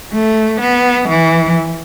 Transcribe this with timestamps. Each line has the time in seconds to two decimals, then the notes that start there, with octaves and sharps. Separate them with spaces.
0.13 A3
0.60 B3
1.08 E3